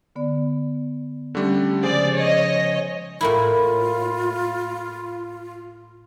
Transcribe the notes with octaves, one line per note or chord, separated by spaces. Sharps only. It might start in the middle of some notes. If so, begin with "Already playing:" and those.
D3 B3 D5
D3 G3 A3 C#4
C#3 F3 G#3 G#4 C5 D5 G#5
C#5 D#5
A2 A#3 E4 F4 B5